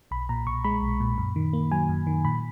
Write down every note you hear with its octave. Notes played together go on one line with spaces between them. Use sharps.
B1 B5
A#2 A#5
B1 C#6
G#3 B5
B1
A#2
F#2
D#3
A#3
F#3 G#5
F#2
D#3
A#2 B5